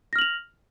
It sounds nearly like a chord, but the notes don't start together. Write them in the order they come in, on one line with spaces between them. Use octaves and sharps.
A#6 F6 F#7 F7